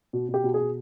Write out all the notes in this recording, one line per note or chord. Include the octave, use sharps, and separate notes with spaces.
B2
B2
G4
B2
G#4
B2